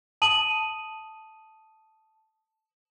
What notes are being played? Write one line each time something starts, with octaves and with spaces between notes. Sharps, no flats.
A5 D#6 D#7 F#7